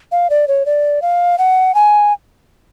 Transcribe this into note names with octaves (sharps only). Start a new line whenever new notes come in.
F5
D5
C#5
D5
F5
F#5
G#5